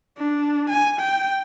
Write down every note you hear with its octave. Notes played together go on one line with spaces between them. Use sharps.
D4
G#5
G5